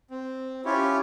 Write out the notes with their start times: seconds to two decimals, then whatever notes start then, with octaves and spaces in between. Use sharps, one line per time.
0.11 C4
0.65 C#4 E4 F4 G4 C#5